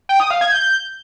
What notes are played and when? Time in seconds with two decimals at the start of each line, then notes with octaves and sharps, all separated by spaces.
0.09 G5
0.20 D#6
0.31 F5
0.41 G#6
0.52 G6